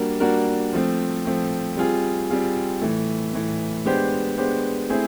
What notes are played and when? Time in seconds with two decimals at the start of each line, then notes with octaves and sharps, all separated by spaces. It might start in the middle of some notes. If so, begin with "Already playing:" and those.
Already playing: G3 A#3 D4 F#4 A#4
0.20 G3 A#3 D4 F#4 A#4
0.73 F3 A3 C4
1.25 F3 A3 C4
1.77 G3 C4 F4 G#4
2.29 G3 C4 F4 G#4
2.82 A2 E3 A3
3.33 A2 E3 A3
3.85 G#3 B3 D4 G4 C5
4.38 G#3 B3 D4 G4 C5
4.89 A3 C4 E4 G#4 C5